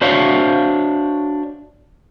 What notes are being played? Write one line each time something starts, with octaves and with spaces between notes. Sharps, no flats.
D4 F#4 C5 C#5 E5 F5